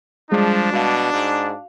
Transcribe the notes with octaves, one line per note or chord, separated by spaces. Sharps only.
F3 G3 G#3 D4 G#4
B2 F#4 F5
G#2